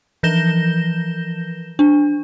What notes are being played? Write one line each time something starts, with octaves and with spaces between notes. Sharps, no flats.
E3 F3 G6 A#6 E7 G7
D4